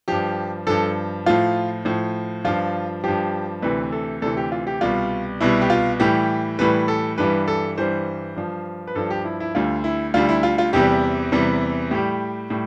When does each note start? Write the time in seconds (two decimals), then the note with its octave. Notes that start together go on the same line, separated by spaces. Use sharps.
0.08 G2 F3 G4
0.67 G2 F3 A4
1.26 A2 F3 F4
1.85 A2 F3
2.44 G2 F3 F4
3.04 G2 F3 G4
3.62 D2 C3 E3 B4
3.92 A4
4.22 D2 C3 E3 A4
4.37 G4
4.52 F4
4.67 G4
4.81 C2 B2 G3 F4
5.41 C2 B2 G3 E4
5.61 G4
5.70 F4
6.00 A2 E3 G3 G4
6.59 A2 E3 G3 B4
6.88 A4
7.18 G2 E3 G3 B4
7.48 A4
7.77 G2 E3 G3 C5
8.36 G2 F3
8.87 B4
8.95 G2 F3 A4
9.10 G4
9.25 E4
9.40 E4
9.55 D2 D3 G3 F4
9.84 E4
10.14 D2 D3 G3 F4
10.29 E4
10.43 F4
10.58 F4
10.73 E2 C3 E3 G3 G4
11.32 E2 C3 E3 G3
11.91 A2 G3 G4
12.50 A2 G3